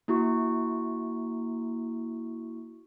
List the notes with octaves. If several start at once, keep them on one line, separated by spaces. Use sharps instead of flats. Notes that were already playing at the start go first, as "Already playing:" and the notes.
A#3 E4 F#4 C#6